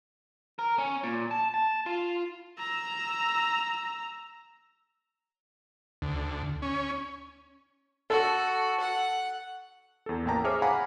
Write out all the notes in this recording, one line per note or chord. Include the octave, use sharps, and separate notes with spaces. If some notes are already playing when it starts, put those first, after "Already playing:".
A#4
C#4
A#2
A5
A5
F4
A#5 E6
D2
C#4
F#4 A4
F#5
E2 A4
A1 A#3 G5 A5 A#5
G#4 C5 C#5 E5 D6 F6
F5 F#5 G#5 A#5 B5 D6